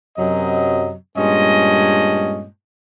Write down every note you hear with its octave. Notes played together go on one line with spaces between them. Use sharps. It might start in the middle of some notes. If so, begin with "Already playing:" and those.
F#2 C3 F#3 D#5
G2 A#2 G#3 C#4 D#5